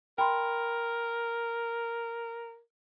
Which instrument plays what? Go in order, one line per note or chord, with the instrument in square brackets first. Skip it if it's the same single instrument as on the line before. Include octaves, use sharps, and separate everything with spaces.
[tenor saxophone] A#4 [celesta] G5 B5 C6